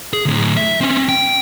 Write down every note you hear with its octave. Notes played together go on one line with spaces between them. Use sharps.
G#4
D2 A2
E5
C4 C#4
G5